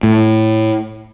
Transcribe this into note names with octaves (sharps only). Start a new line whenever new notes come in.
A2